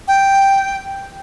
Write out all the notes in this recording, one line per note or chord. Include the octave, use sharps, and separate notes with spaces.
G5